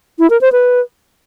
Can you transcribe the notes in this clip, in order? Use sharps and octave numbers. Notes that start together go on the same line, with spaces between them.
E4
A#4
C5
B4